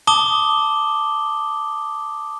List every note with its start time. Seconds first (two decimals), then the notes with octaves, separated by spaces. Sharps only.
0.07 A5 D6 D#6 G7